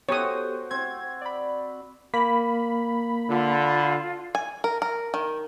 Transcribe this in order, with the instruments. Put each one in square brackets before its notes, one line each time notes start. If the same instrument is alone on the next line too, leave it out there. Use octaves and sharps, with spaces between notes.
[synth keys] B3 G4 A4 [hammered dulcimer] F#4 C5 G5 [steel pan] C#5 D#6
[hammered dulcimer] C4 [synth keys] G#6
[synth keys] D5 B5
[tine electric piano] A#3 [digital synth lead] B5
[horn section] D3 [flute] F4
[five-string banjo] G#5
A#4
A#4
D#3